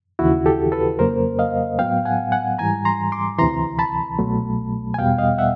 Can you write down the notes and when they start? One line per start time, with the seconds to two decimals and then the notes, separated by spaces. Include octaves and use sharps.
0.19 D#2 C#3 E3 E4 F#4
0.46 G4 A4
0.72 A4 B4
0.99 F2 C#3 F#3 A#3 A#4 C5
1.39 D#5 F5
1.79 A2 F#3 B3 F5 G5
2.05 F#5 G#5
2.32 F#5 G#5
2.59 G#2 E3 G3 G#5 A#5
2.85 A#5 C6
3.12 C6 D6
3.38 D2 C3 E3 A#5 C6
3.79 A5 B5
4.19 C2 B2 F#3 A3
4.94 G#5
4.98 E2 B2 G3 B3 F5 G5
5.18 D#5 F5
5.38 E5 F#5